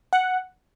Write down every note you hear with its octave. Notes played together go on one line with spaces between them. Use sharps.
F#5